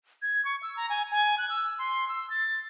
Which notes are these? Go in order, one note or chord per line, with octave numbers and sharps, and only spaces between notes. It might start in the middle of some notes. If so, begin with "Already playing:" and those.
G#6
C#6
E6
A#5
G#5
G#5
F#6
E6
C6
E6
A6